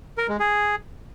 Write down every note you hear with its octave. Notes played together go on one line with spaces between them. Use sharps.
A#4
G#3
G#4